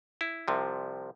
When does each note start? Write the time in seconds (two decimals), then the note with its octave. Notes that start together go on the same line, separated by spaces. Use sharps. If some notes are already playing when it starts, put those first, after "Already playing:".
0.21 E4
0.48 C2 C3 F3